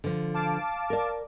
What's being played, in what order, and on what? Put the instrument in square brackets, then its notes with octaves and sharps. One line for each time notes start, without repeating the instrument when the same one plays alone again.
[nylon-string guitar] D3 F3
[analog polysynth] F5 A5 D6
[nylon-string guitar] A#4 D5